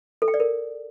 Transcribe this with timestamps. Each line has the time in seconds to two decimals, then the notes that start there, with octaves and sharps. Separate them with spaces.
0.22 A4
0.28 G5
0.34 D5
0.40 A#4